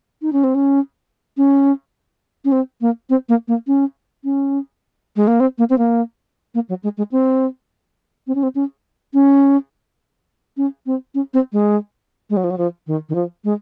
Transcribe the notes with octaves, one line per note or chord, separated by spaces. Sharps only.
D#4
C#4
C4
C#4
C#4
C#4
C4
A#3
C4
A#3
A#3
C#4
C#4
G#3
A#3
C4
A#3
C4
A#3
A#3
F#3
G#3
G#3
C4
C4
C#4
C4
C#4
C#4
C#4
C4
C#4
C4
G#3
G#3
F#3
F3
F#3
F3
D#3
D#3
F3
G#3